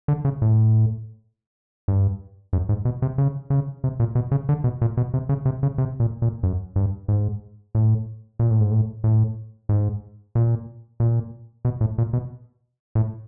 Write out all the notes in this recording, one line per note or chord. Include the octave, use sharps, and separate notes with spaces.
D3
C#3
A2
G2
F#2
G#2
B2
C3
C#3
C#3
C3
A#2
B2
C#3
D3
B2
A#2
B2
C3
C#3
C3
C#3
C3
A#2
A#2
F#2
G2
G#2
A2
A#2
A2
G#2
A2
A2
G#2
A#2
A#2
B2
A2
A#2
B2
A2